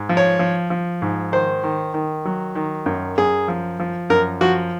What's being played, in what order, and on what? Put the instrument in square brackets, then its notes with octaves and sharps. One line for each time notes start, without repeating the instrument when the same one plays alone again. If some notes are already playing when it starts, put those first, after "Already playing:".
Already playing: [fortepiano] G#2
F3
C#5
F3
F3
G#2
D#3 C5
D#3
D#3
F#3
D#3
F#2
F#2 G#4
F3
F3
F#2 A#4
F3 F#4